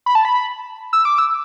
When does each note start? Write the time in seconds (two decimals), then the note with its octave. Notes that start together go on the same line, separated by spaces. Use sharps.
0.06 B5
0.15 A5
0.25 B5
0.93 E6
1.05 D6
1.18 E6